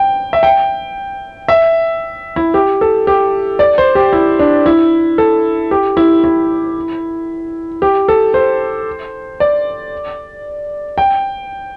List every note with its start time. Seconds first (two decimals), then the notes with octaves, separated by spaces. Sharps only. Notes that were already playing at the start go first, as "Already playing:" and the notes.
Already playing: G5
0.33 E5
0.43 G5
1.48 E5
2.36 E4
2.54 G4
2.81 A4
3.07 G4
3.59 D5
3.78 C5
3.95 G4
4.13 E4
4.39 D4
4.66 E4
5.18 A4
5.71 G4
5.97 E4
6.24 E4
7.82 G4
8.08 A4
8.34 C5
9.40 D5
10.98 G5